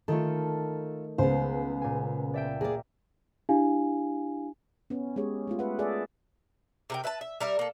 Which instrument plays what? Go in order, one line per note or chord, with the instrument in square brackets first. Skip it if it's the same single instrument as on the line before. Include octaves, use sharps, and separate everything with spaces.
[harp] D#3 A3 [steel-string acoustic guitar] F4 A4
[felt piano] C#2 [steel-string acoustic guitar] B3 C5
[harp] A#2 G#5
D5 E5 G5
[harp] A#3 [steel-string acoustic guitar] G#4 D5
[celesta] D4 E4 G4 F5 G#5
[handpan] B3 C#4
G#3 C#4 G4 G#4 C#5
G#3 A3 F4
G#4 B4 E5 F#5
G#4 A4 D5 E5
[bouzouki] C3 A#4 G5
B4 E5 G#5 A5
E5
G3 A#4 E5
A#3 A4